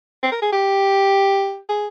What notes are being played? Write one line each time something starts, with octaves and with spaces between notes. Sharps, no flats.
C4
A#4
G#4
G4
G#4